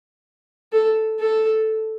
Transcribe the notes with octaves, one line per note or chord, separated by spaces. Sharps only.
A4
A4